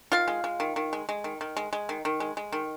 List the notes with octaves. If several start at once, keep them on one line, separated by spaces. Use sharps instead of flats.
D#3 F4 F5
G#3
G#3
D#3
D#3
G#3
G#3
D#3
D#3
G#3
G#3
D#3
D#3
G#3
G#3
D#3